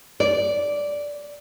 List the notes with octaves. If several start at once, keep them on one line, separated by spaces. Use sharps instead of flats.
D5